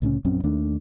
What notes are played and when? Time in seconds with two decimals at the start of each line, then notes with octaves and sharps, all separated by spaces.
0.02 C2 A2 C#3 C#4
0.24 A#1 F#2 C4 C#4
0.43 D#2 D#3 A3 D4